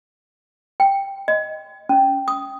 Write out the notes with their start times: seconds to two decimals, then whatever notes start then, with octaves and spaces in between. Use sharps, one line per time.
0.80 G5
1.28 D#5
1.89 C#4
2.28 D#6